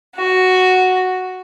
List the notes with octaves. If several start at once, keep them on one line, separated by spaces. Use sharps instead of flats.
F#4